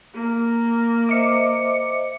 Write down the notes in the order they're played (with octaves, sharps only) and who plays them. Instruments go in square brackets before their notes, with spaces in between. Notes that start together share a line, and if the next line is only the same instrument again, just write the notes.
[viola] A#3
[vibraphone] C5 D#5 E5 [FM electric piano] D6 C#7